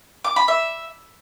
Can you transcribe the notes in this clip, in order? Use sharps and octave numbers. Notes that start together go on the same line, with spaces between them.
D6
B5
E5